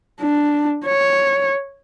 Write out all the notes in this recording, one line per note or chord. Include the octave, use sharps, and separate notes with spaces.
D4
C#5